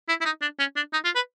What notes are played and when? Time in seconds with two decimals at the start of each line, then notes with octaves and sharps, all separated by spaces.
0.09 E4
0.21 E4
0.25 D#4
0.42 D4
0.59 C#4
0.76 D4
0.93 D#4
1.05 F4
1.15 B4